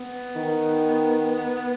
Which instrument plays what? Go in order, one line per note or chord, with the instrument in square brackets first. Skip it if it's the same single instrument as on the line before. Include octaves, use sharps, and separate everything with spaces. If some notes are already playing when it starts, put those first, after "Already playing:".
Already playing: [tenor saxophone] B3
[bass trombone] D#3